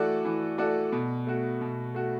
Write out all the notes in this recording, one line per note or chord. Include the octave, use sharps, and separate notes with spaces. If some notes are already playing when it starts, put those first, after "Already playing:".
Already playing: E3 A3 F#4 A4 D5
E3
A3 F#4 A4 D5
B2
A3 F#4
B2
A3 F#4